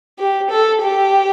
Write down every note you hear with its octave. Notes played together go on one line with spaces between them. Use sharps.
G4
A4
G4